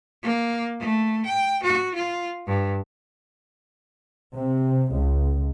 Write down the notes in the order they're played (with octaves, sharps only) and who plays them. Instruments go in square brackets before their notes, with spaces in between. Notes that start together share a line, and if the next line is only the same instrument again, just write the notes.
[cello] A#3
A3
G5
F#4
F4
G2
[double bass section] C3
C#2